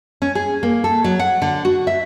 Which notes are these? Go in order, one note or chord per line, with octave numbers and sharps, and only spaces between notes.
C#4
G#4
A#3
A4
F#3
F#5
D3
F#4
E5